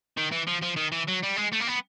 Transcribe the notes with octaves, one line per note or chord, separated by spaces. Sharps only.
D#3
E3
F3
F3
D#3
E3
F#3
G3
G#3
A3
A#3
B3